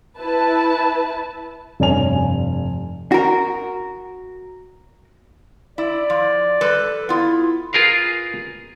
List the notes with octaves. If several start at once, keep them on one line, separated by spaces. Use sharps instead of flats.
E4 B4 A5
F1 G2 C#5 G#5 F7
F#4 A#4
E4 D5
F3
G3 A4 B4
B3 E4 F4
F4 G#4 A#4 B4 F5